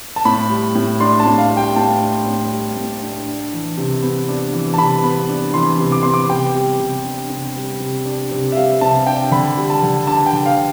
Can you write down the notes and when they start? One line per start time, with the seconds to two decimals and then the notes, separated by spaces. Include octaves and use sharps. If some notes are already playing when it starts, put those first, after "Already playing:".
0.16 A5
0.25 A2 B5
0.50 G3
0.75 A2
1.00 D4 C6
1.20 A5
1.26 A2
1.38 F5
1.51 G3
1.57 G5
1.76 A2 A5
2.01 D4
2.26 A2
2.52 G3
2.77 A2
3.02 D4
3.27 D4
3.53 E3
3.78 C3
4.02 B3
4.28 D4
4.53 E3
4.74 A5
4.78 C3 B5
5.04 B3
5.29 D4
5.54 E3 C6
5.79 C3
5.92 D6
6.03 B3 C6
6.14 D6
6.29 C3 G5
6.55 G3
6.80 C3
7.05 D4
7.30 C3
7.56 G3
7.80 C3
8.05 D4
8.31 C3
8.52 E5
8.56 G3 F5
8.81 C3 A5
9.07 D4 G5
9.31 D3 B5
9.57 G3
9.70 A5
9.83 D3
10.07 D4 A5
10.26 G5
10.33 D3
10.46 F5